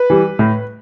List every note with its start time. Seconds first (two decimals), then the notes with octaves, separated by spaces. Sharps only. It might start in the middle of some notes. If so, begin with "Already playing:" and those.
Already playing: B4
0.10 E3 G3
0.39 A2